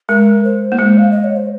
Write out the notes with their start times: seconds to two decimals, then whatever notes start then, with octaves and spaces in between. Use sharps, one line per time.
0.09 G#3 A#4
0.44 C5
0.72 A#3
0.79 G#3 C5
0.98 F5
1.11 D#5
1.24 C#5
1.37 C5